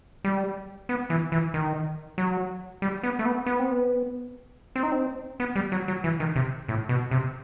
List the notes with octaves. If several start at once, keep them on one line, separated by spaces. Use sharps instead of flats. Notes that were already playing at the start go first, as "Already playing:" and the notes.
G3
B3
E3
E3
D#3
F#3
G3
B3
A3
B3
B3
C4
B3
C4
D#4
C4
B3
G3
F#3
F#3
E3
D#3
C3
A2
B2
C3